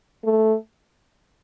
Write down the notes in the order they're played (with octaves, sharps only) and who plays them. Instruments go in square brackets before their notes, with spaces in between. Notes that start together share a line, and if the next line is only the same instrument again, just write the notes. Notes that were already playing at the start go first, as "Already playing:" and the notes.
[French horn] A3